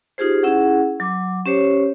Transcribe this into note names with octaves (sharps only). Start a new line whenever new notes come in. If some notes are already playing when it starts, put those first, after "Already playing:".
D#4 F4 G4 G#4 C5
C#4 E4 G#4 F#5
F#3 D6
C#4 G4 C5 C#5